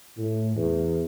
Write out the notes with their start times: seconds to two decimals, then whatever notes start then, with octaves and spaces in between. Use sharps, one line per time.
0.17 A2
0.56 E2